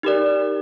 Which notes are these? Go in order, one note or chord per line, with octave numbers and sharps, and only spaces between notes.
D#4 G4 A#4 D5